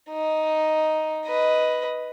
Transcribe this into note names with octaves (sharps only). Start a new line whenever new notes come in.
D#4
B4 D#5